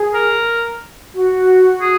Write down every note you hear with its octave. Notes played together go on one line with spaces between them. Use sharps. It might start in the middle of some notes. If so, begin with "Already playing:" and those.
Already playing: G#4
A#4
F#4
G#4